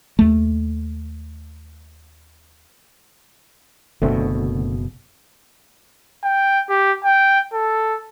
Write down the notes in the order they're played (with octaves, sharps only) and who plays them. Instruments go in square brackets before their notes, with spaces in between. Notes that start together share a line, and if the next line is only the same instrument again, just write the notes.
[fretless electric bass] D#2 A3
[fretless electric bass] F#1 B2 [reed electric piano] D3 A3 C4
[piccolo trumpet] G5
G4
G5
A4